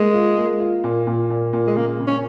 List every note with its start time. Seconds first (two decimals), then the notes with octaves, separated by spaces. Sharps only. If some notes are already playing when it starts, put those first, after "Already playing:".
Already playing: G#3 A#3
0.14 F4
0.38 A#3
0.60 F4
0.84 A#2
1.07 A#2
1.30 A#2
1.53 A#2
1.67 G#3
1.76 C#3 A#3
2.00 C#3
2.07 C#4